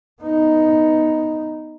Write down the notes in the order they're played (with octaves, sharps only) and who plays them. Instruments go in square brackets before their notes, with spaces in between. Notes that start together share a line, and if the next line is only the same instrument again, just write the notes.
[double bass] B3 D#4